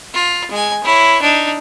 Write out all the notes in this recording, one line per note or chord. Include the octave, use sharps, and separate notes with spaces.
F4
G#3 G#5
E4 C#5
D4 D#4